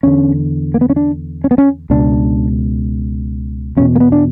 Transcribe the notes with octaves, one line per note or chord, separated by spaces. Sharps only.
E2 D3 C#4
A#3
B3
C#4
D4
C#4
B3
C#4
C#2 B2 D4
E2 B2 C#4
A#3
B3
D4